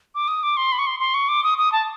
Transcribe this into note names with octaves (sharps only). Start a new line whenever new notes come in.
D6
D#6
D6
C6
B5
C#6
C6
C6
C#6
D6
D#6
D#6
A5